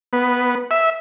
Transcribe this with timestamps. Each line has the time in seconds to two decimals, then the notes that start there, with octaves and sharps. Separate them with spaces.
0.13 B3
0.71 E5